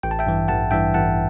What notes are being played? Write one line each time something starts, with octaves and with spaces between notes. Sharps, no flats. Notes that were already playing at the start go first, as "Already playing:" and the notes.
A1 G5
A5
E5 G5
G2 E3
A1 F#5 A5
G2 E3 E5 G5
A1 F#5 A5